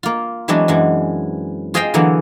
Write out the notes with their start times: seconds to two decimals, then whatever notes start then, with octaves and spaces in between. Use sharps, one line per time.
0.03 A#3 F4
0.48 E3 F#3 G#3 B3 C4 D4
0.68 F#2 E3 G#3
1.74 F4 G#4 C5 D#5 F5 G5
1.94 D3 E3 F#3 A#3 B3